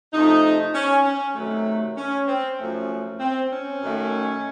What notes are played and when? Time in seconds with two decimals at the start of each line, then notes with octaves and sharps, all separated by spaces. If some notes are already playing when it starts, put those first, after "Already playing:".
0.13 C3 F3 A3 D#4
0.74 C#4
1.04 C#4
1.35 C3 D#3 F#3 A3
1.97 C#4
2.27 C4
2.58 F#2 F3 A3 C#4
3.20 C4
3.51 C#4
3.81 F#2 D#3 A3